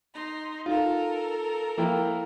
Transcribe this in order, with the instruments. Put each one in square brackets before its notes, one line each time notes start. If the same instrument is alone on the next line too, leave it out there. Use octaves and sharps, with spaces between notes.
[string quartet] D#4 C6
[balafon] D#4 [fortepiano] F4 [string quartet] A4 A#4
[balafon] F3 [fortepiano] A#3 E4 G5